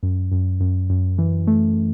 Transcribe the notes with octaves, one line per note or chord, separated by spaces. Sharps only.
F#2
F#2
F#2
F#2
E3
A3